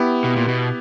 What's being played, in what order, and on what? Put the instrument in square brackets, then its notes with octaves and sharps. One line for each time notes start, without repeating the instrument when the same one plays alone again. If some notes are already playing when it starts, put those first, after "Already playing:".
Already playing: [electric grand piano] B3 E4 G4
[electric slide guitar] B2
A#2
B2